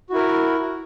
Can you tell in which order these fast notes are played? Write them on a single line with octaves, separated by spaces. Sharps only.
F#4 E4 A#4